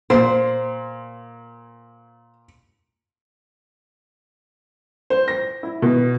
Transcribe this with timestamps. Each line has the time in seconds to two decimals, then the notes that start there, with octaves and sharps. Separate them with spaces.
0.10 A#2 C5
5.10 C5
5.28 A#6
5.63 E4
5.82 B2